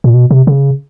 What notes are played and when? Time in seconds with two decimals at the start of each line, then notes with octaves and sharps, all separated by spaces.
0.04 A#2
0.14 B2
0.31 C3
0.47 C#3